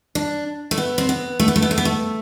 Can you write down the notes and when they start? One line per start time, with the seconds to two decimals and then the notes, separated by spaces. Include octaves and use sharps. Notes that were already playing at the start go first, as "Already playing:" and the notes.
0.15 D4
0.71 A3
0.78 B3
0.98 C4
1.09 B3
1.40 A3
1.48 B3
1.56 A3
1.62 B3
1.71 A3
1.78 B3
1.85 A3